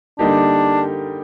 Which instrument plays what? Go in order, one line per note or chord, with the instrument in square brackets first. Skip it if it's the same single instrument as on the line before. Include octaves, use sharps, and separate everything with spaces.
[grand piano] D3 G3 A#3 D#4 G4 [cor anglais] D4